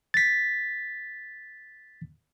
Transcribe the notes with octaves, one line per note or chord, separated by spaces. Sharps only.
A6 B6